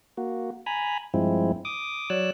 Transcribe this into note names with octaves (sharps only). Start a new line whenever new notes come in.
A#3 F#4
G#5 A#5 B5
G2 F3 G#3 C4 E4
D6 D#6
F#3 C#5 D5 E6 F#6